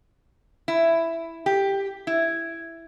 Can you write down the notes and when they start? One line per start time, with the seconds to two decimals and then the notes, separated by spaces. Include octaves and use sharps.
0.68 E4
1.46 G4
2.07 E4